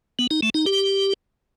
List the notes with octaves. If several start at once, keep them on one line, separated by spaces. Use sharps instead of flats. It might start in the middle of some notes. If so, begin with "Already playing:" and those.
B3
D#4
A3
D#4
G4